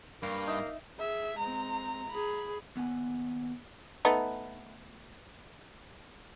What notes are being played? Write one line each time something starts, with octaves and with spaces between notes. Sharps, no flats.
G2 A#3
D#4 E5
G#4 E5
G#3 C4 A#5
G#4 B5
D#2 B3 F#5 G#5
A3 B3 D#4